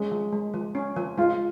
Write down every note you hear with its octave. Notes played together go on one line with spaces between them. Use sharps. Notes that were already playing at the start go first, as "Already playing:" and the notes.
Already playing: G#3 C#4
F3
G#3
F3
C#4
F3
G#3 F4